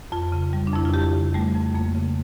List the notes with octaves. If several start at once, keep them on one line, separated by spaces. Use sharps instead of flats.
F2 F4
C#3
G3
D4
F2 E4
F4
F2 G4
C#3
G3 A3
F2
F2 A#3
C#3